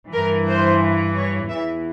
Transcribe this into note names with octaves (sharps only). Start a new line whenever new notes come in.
G2 E3 A#4
C5
C#5
E2 E3 E5